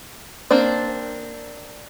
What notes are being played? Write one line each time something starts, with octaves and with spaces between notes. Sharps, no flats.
A#3 C4 D4 D5